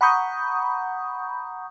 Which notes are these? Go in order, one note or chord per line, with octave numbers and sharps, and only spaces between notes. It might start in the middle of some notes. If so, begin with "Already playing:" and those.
F#5 A#5 B5 C#6 D#6 G6